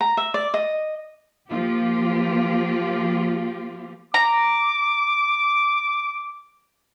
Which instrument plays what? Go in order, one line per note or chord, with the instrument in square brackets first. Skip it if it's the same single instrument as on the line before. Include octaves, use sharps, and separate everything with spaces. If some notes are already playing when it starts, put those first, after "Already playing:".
[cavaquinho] A#5
E5
D5
D#5
[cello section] F3 A#3 F4 G4
[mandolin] A#5 [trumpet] D6